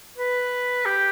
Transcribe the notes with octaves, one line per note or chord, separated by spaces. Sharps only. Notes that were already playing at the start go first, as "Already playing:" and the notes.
B4
G4